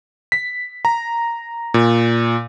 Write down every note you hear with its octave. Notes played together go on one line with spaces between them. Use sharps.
B6
A#5
A#2